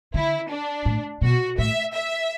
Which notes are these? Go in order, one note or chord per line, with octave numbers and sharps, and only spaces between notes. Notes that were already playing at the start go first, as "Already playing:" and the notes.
D3 E4
D4
A2
B2 F#4
A2 E5
E5